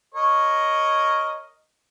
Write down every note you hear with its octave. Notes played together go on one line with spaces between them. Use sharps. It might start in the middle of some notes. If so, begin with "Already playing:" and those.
A#4 C#5 D#5